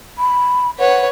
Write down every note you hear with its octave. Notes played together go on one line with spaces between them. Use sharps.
B5
B4 C#5 F#5